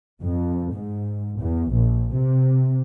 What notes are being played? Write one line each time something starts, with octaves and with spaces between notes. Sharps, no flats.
F2
G#2
E2
A#1
C3